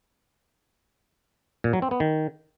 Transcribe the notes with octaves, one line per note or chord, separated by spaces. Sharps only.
A#2
F#3
C4
B3
D#3